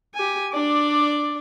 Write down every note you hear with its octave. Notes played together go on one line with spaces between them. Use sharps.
G4 G#5
D4 D5